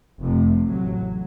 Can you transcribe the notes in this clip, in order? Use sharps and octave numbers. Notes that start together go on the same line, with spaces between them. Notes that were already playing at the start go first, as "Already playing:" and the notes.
F1 F2 C3 A3
A1 A2 F#3